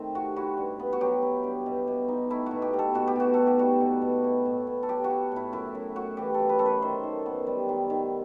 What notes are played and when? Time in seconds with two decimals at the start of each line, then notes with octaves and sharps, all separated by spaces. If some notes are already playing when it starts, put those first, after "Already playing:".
Already playing: D#3 A3 C4
0.15 C3 F#4
0.36 E4 F#4
0.57 G2
0.80 B3
0.93 F#4
1.01 F#3 G4
1.22 E4
1.44 G2
1.66 B2
1.88 B2
2.08 D#4
2.30 A3 E4
2.46 B2 F#4
2.62 G4
2.73 B2
2.79 A4
2.94 B2 F#4
3.08 G4
3.16 B2 F#4
3.34 D#4 A4
3.47 G4
3.59 G3 F#4
3.80 B2
4.02 B2
4.24 E4
4.45 A2
4.67 B3
4.83 A4
4.88 F#3 G4
5.04 F#4
5.10 E4
5.32 A2 E4
5.52 F#2 E4
5.75 F#2
5.96 A3 F#4
6.17 E3 G4
6.34 A4
6.39 F#2
6.49 B4
6.59 F#2 A4
6.66 B4
6.82 D#3 C5
7.03 D#3
7.26 B3
7.47 G3
7.69 D#3
7.90 D#3